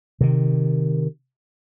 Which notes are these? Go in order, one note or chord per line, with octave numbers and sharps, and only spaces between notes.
C3 D#3